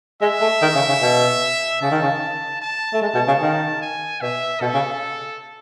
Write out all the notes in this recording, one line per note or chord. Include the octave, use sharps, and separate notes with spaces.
G#3 E5
A3
D#3
C#3
C#3
B2
C#3 A5
D#3
C#3
A5
A3
G#3 A5
B2
C#3
D#3
G#5
B2 E5
B2 A4
C#3